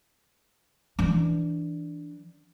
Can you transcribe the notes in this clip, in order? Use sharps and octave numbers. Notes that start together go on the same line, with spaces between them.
E3 D4